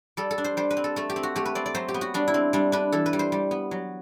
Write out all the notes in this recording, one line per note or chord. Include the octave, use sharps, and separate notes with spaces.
G3 A4
A4
D4
C5
G3 C5
B4
C4
A4
A3 A4
G4
C4
F#4
A3 G4
B4
C4 D5
D5
F#3 C5
G4
B3
F#4
G3 D4
E4
C4
G3 D4
D4 B4
E3 A4
B4
G3
C5
G3
B3
F#3